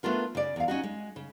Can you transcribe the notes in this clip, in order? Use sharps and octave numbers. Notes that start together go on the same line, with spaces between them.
A3 B3 D4 F4 A#4
C#3 D5
E2 F5
C#4 D#4 F#4
G#3
C#3